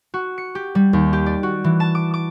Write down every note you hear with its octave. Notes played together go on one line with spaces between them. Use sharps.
F#4
C#7
G4
G3
D#2
G4
D5
F#4
E3
A5
D6
D6